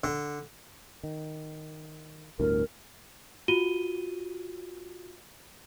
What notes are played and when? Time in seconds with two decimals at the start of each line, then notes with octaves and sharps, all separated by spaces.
0.04 D3
1.03 D#3
2.39 G1 D2 A2 A#4
3.48 F4 F#4 D#7 G7